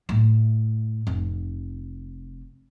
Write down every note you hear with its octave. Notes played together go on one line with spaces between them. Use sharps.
A2
F1